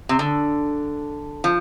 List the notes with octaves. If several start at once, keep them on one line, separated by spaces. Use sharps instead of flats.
C3
D3
F3